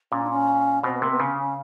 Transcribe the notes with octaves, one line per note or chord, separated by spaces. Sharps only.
A#2 C#4
D4
C#4
B2 C4
B3
C3 A#3
B3
C#3 C#4
C#4